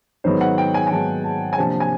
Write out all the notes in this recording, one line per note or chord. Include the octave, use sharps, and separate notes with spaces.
G#2 D#3 F#3 B3 C5
F#5
G5
G#5
G#5
G#2 D#3 F#3 B3 A5
A5
G#5
C3 F3 A#3 D4 A5
A5
G#5